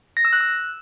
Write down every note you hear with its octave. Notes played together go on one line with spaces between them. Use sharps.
A#6
E6
F#6
E6